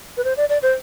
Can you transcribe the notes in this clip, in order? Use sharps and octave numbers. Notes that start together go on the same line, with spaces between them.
B4
C5
D5
D5
C5